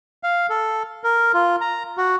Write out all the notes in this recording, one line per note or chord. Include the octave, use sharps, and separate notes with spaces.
F5
A4
A#4
F4
A#5
F#4